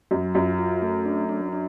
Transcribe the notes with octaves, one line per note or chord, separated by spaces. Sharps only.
F#2 F#3
F#2 F4
F4
A3
D4
D4
D4